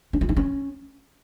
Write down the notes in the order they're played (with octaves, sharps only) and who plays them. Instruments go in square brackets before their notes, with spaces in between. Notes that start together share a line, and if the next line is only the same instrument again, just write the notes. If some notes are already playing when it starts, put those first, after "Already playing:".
[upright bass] D4
F4
D#4
C#4